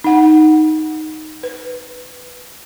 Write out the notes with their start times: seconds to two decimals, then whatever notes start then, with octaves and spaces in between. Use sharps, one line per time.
0.04 D#4 F#5
1.43 B4